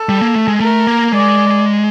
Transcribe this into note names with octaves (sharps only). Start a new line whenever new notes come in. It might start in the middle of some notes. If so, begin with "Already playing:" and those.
Already playing: A4
G3
A#3
A3
G#3
A3 A#4
A#3
G#3 D5